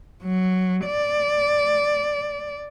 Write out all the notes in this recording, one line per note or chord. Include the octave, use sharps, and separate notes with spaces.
F#3
D5